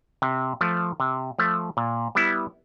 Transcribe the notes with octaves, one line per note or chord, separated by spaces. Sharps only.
C3
F3 A3
C3
F3 A3
A#2
G3 B3 E4